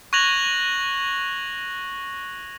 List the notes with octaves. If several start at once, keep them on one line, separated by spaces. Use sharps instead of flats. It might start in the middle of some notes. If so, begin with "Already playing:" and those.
C#6 F#6 G#6 A#6 F7 F#7